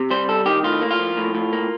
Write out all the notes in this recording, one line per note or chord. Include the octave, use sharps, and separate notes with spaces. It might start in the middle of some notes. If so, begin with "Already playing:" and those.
Already playing: C3
G3 C5
C2 A4
D#3 G4
A2 F4
A#3
F4
F3
A2
A2
A#3